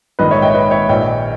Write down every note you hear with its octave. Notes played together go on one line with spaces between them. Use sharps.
A#1 G#2 D#3 B4 D#5
C#5 E5
D#5 G5
B4 D#5
C#5 E5
A#1 A#2 D#5 G5